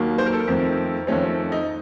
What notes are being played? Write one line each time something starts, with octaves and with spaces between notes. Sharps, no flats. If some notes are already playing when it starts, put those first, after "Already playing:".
Already playing: D#2 D#3 F#3 A#3
C5
A#4
A4
A#4
F2 D#3 A3 C4
F2 D#3 A3 C4 C#4
C4
D#4